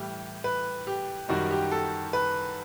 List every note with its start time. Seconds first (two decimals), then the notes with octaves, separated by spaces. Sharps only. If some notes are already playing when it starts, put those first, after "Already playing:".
Already playing: A2 E3 G3 G4
0.44 B4
0.87 G4
1.29 F#2 D#3 G3 F#4
1.50 G4
1.71 A4
2.13 B4